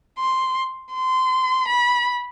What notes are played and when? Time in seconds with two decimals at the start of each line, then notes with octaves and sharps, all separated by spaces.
0.19 C6
0.94 C6
1.68 B5